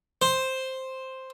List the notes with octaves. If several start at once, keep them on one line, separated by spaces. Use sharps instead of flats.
C5